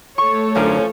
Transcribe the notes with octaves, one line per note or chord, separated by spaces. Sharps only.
A3 A4 C#5 C#6
F#2 D3 E3 F3 C#4 A#4